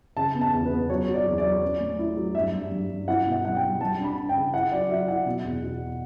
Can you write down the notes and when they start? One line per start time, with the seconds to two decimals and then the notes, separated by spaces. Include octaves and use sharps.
0.17 C#3 A5
0.35 B3
0.41 A5
0.53 E2
0.66 B4
0.72 B3
0.90 F#3 C#5
1.08 F#3
1.14 D5
1.26 E2
1.38 D5
1.44 F#3
1.62 C#4
1.80 A2
1.99 E4
2.17 F#3
2.35 G2 E5
2.53 G2
2.72 G2
2.90 G2
3.08 E4 F#5
3.26 B2
3.32 F#5
3.44 G3 F#5
3.56 G5
3.63 G3
3.81 G3 A5
3.99 D4
4.04 B5
4.17 D4
4.29 G5
4.35 C#3
4.53 E4 F#5
4.72 F#3 D5
4.90 F#3 E5
5.08 E4 F#5
5.26 B2
5.44 E2
5.63 B2